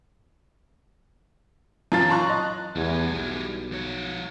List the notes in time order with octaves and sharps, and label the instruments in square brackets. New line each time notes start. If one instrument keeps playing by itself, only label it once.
[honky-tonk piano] F#2 E3 F4 F5 A5 A6
A5 A#5 C6 C#6 F#6
D#5
[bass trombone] E2 [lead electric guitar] G3 G#4
[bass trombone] B1
[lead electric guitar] F3 C#5